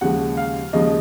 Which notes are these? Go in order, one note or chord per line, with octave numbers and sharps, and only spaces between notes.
D#2 C#3 F3 G#3 F#5
F5
D#2 C#3 F3 G#3 D#5